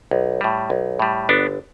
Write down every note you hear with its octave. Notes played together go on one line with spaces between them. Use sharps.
B1
A2 G3
B1
A2 G3
G1 B3 D4